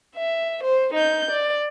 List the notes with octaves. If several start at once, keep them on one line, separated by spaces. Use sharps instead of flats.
E5
C5
D#4 G6
D5